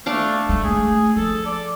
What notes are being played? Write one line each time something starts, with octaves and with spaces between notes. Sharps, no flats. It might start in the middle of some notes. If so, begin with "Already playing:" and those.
A3 D4 F5
G#3 A3
A3 G#4
F3 A4
D5